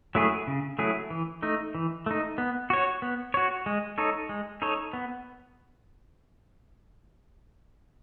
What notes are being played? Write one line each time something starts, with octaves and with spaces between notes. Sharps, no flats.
F#3 A3 E4 G#4
C#3
F#3 A3 E4 G#4
E3
A3 D#4
E3
A3 D#4
B3
F#4 C#5
B3
F#4 C#5
G#3
D#4 A4 C#5
G#3
D#4 A4 C#5
B3